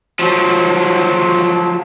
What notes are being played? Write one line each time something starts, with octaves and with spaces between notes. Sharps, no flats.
F3 F#3